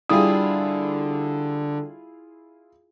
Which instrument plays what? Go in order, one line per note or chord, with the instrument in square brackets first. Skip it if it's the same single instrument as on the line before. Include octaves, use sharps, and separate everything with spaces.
[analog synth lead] D3 [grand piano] G3 D#6 [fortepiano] E4 F4 G#4